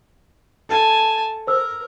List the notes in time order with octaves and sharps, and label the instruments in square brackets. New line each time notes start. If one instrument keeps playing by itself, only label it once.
[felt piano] A4 [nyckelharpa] G#5 A5
[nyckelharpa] A#4 [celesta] C5 E6